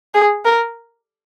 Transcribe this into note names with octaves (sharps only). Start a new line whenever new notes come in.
G#4
A#4